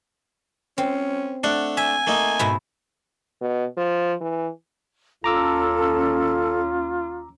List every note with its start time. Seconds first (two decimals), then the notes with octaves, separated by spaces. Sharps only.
0.78 C4 C#4
1.44 A3 D4 F#5
1.77 E5 G#5
2.07 A3 A#3 D#4
2.39 G#2 B2 E4
3.41 B2
3.77 F3
4.21 E3
5.24 D#2 C#4 F4 A4 A#5 D6 E6